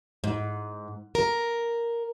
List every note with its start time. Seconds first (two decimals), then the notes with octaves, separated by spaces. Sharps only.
0.24 G#2
1.15 A#4